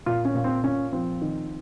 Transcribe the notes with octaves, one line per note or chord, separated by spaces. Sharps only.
A#2 F4
C#4
A#2
C4
A#2 C#4
F3 C4
D#3